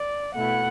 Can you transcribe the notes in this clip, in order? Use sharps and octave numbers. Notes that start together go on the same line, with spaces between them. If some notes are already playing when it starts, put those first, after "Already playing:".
Already playing: D5
B2 A3 E4 F#5